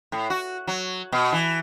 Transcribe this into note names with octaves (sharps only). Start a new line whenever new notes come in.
A2
F#4
F#3
B2
E3